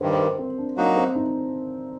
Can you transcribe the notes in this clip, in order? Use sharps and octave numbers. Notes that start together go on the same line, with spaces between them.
G2 D#3 G3 C5
C5
A#4
C4
D4
F#3 A#3 D4 D#4 F#4
C4
D#4